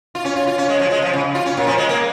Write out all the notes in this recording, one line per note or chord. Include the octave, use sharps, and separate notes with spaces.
F4
C#4
F4
F4
C#4
G#3
F3
G#3
F3
C#3
F4
C#4
A#2
F3
G#3
A#3